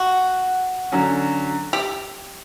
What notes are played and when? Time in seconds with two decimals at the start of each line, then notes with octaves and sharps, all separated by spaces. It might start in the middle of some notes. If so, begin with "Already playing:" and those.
Already playing: F#4
0.92 D3 F#3 C#4
1.73 G4